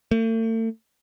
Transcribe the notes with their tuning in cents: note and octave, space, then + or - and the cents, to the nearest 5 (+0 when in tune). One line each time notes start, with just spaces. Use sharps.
A3 +40